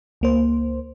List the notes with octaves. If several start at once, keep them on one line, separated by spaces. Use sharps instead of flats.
C#2 A#3 C5